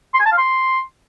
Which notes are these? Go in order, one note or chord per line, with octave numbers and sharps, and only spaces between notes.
C6
G#5
A5
F5
C6